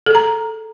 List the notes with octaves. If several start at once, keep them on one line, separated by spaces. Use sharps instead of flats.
G#4 A4 A#5